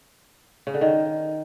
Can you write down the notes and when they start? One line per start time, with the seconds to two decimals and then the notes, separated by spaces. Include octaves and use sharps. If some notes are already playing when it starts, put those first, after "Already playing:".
0.67 C#3
0.74 D3
0.81 D#3